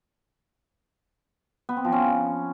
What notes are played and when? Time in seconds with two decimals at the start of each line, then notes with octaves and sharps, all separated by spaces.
1.69 B3
1.77 C4
1.85 F3
1.92 C#4